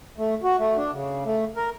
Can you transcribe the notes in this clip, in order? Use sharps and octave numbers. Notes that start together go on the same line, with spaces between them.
A3
F#4
A3
D4
C#3
A3
A#4